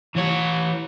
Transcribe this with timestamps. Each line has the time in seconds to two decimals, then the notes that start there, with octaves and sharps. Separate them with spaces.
0.15 E3 C#5